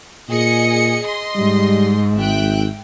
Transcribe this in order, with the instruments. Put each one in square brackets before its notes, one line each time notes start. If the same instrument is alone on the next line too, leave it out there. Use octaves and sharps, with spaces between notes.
[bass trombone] A#2 [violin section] G#4 D#5 C#7
[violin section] D#5 C6
[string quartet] G#2 [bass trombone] G3
[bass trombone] G#1 [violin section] E5 G5 F#6